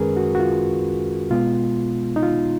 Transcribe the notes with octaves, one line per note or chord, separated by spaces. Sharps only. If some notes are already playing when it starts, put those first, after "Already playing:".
Already playing: F#2 D#3 G#3 C#4 G#4 A#4 B4
F#4
F#4
F4
B2 G#3 B3 F4
D#4
F4